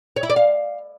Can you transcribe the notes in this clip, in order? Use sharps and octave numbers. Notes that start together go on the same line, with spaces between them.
C#5
E4
D5
F5